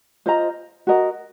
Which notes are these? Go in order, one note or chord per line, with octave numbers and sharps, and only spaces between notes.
F4 C5 D#5 A#5
F#4 A#4 D#5